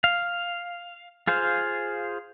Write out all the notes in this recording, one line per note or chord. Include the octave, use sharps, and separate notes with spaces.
F5
F4 G#4 C5 F5